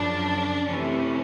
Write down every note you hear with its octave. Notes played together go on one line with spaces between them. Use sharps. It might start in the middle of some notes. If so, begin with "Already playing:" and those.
Already playing: F#2 C#3 F3 D4
C3 E3 A3 C#4